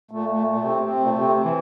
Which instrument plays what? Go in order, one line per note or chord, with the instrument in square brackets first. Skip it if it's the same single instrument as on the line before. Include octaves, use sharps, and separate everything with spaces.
[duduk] A#2 [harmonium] A3
[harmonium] A3
A3
[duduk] A#2
[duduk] C3 [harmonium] C4
[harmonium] C4
A3
[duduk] A#2
[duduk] C3 [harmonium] C4
[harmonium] C4
[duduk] E3